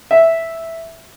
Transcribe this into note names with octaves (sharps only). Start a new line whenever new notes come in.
E5